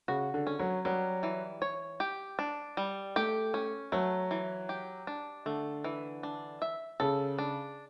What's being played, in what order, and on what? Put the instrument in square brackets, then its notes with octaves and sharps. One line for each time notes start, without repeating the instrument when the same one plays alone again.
[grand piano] C#3 [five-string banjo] F#4
[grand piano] D3
[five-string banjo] C#4
[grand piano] F#3
[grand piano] F#3 [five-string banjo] G3
[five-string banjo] E3
C#5
G4
D4
G3
[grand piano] A3 [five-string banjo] G4
[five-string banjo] C#4
[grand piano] F#3 [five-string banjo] A3
[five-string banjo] E3
G4
D4
[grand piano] D3 [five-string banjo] A3
[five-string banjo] E3
D4
E5
[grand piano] C#3 [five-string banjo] A4
[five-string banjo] D4